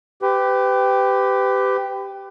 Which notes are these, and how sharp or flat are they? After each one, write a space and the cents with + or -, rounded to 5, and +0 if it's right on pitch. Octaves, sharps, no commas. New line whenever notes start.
G4 +0 B4 +30